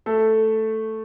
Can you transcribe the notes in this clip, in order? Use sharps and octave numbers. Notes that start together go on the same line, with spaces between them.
A3 A4